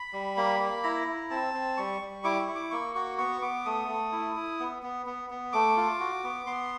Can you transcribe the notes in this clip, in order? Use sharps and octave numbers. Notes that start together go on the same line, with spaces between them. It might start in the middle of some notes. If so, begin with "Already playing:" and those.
Already playing: B5
G3
A#3
A#3
E4 A#5
E4
C4 A5
C4
G3 C#6
G3
E4 D6
C#6
E4
D6
A#3 C#6
F#4 C#6
B3 C#6
B3 D6
A3 D#6
A3
E4
E4
B3
B3
B3
B3
A3 D6
F4
F#4
B3
B3 C6